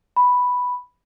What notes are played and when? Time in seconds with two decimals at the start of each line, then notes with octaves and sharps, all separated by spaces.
0.16 B5